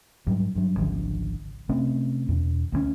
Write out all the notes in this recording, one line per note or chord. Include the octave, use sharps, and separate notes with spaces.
G#2 F#3 G3
G2 F#3
G#1 C#2 D3 F3
C3 A3 C4 C#4
E2 B2
D2 G3 C#4